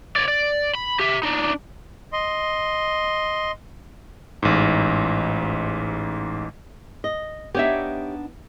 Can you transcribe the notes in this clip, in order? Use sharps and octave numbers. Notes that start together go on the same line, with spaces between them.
C#5 D5
D5
B5
G4 E5
D4 D#4
D#5 C6
A1 G#2
D#5
B3 D4 D#4 G4 C#5 E5